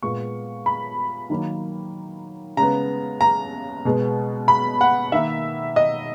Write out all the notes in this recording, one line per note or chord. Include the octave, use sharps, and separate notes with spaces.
A#2 G#3 B3 C#6
B5
D#3 F#3 A#3
C#3 G#3 B3 A#5
A#5
B2 G#3 B3
B5
F#5
D#3 A#3 E5
D#5